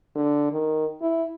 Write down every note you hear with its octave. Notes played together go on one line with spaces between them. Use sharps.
D3
D#3
E4